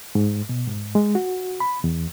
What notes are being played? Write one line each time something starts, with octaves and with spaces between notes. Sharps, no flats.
G#2
B2
G#2
G#3
F#4
B5
E2